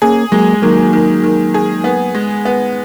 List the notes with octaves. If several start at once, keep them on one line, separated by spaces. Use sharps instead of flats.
A#3 C#4 G#4
F#3 G#3 A#3
D#3 F#3 A#3
D#3
D#3
G#4
B3
G#3
B3